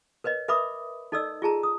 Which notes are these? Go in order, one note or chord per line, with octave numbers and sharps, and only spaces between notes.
A#4 B4 C#5 D#5
A#4 B4 E5 B5 D6 D#6
D#4 A4 D5 D#5 E6
F4 G#4 A5 A#5
D#6